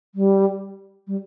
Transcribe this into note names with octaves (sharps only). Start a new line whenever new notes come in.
G3
G3